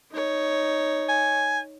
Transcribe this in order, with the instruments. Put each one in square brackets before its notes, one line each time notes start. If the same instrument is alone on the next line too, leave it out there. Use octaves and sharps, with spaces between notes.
[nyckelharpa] D#4 C#5
[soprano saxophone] G#5